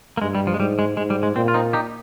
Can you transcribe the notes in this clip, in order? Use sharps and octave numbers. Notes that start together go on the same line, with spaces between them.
A#3
G2 G#3
G3
F3
G#3
G#2 G3
G#3
G#2 G#3
G3
G#3
A#2 C4
F4
C4 D#4
D#4 G4